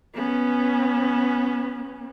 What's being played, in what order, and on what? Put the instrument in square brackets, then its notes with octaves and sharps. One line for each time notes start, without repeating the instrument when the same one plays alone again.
[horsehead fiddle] B3 C#4